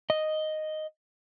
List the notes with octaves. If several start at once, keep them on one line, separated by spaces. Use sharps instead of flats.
D#5